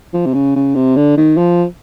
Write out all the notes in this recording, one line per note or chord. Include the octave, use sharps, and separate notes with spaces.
F3
C3
C#3
C#3
C3
D3
D#3
F3